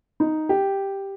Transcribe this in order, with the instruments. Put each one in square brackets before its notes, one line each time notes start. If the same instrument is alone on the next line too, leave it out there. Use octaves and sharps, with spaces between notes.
[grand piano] D#4
G4